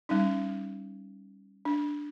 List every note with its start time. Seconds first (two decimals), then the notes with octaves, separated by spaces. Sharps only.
0.09 G3 C#4 D#4
1.65 D4